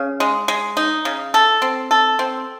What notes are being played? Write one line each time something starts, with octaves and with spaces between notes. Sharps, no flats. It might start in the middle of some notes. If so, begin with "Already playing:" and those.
Already playing: C#3
G#3
G#3
D#4
C#3
A4
C4
A4
C4